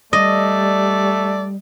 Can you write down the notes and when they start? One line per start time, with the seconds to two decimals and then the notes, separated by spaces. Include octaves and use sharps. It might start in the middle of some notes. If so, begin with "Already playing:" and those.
0.13 G3 A3 D5 D#5